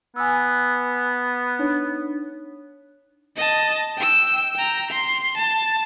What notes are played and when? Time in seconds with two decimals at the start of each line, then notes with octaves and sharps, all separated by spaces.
0.16 B3 G#5 E6
1.59 D4 D#4 C#5
3.37 D#5 A5
3.98 G5 E6
4.56 G5 A#5
4.91 C6
5.37 A5